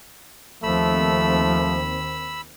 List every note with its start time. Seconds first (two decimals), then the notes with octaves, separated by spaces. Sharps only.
0.63 D#2 D#3 F3 A3 C4 B5 E6